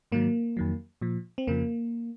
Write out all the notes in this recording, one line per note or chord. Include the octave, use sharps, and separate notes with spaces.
G#2 D#3 F#3 A#3
F2 D#3 F#3
A#2 F3
C4
F2 C#3 F3 A#3